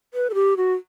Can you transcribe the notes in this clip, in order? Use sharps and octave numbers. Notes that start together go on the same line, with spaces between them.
B4
A4
G4
F#4